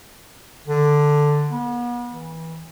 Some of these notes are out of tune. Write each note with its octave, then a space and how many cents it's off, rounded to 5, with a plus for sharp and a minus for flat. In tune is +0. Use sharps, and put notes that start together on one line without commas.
D3 +5
B3 -40
E3 -25